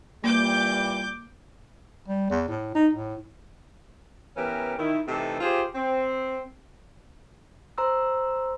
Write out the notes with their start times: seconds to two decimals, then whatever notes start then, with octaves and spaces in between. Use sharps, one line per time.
0.24 A#2 E3 G3 A#3 D6 G6
2.08 G3
2.30 E2
2.48 A2
2.75 D#4
2.93 A2
4.36 E3 B3 C#4 G4 A#4
4.78 D#3 E4
5.07 C3 E3 A3 C4 D#4 A4
5.41 F4 G4 G#4 C5
5.75 C4
7.78 C5 A#5 C6 E6